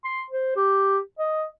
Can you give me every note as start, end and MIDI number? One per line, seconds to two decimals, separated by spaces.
0.04 0.22 84
0.31 0.55 72
0.56 0.98 67
1.19 1.45 75